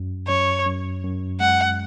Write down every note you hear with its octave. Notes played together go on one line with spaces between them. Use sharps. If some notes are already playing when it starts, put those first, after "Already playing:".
Already playing: F#2
F#2 C#5
F#2
F#2
G#3 F#5